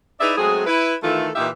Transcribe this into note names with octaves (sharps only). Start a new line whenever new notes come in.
D#4 E4 G#4 B4 D5 E5
F#3 G#3 A3 C4 G#4
E4 B4
D#3 E3 A3 E4 F4 A4
A#2 E3 D#4 F4 G4 E5